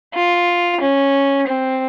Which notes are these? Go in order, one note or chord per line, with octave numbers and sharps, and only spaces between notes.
F4
C#4
C4